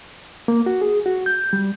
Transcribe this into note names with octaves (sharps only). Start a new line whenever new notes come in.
A#3
F#4
G#4
F#4
G6
G3